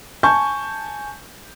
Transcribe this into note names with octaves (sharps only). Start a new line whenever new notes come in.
G#5 A5 C#6 G6